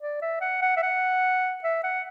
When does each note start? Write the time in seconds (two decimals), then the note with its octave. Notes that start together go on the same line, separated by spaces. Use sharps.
0.01 D5
0.22 E5
0.41 F#5
0.62 F#5
0.77 E5
0.83 F#5
1.64 E5
1.83 F#5